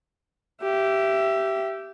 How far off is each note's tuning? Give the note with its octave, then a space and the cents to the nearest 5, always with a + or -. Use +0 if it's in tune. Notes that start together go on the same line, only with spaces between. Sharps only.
G4 -15 E5 +15